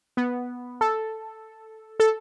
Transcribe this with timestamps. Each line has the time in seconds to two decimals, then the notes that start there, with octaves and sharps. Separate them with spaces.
0.17 B3
0.81 A4
2.00 A4